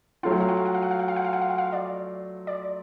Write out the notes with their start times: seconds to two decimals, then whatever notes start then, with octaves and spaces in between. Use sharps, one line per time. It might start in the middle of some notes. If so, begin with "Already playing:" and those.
0.23 F#3 A3 F4 F5
0.32 F#5
0.41 F5
0.49 F#5
0.57 F5
0.66 F#5
0.74 F5
0.82 F#5
0.91 F5
0.99 F#5
1.08 F5
1.16 F#5
1.25 F5
1.33 F#5
1.42 F5
1.50 F#5
1.58 F5
1.73 D5
2.47 D5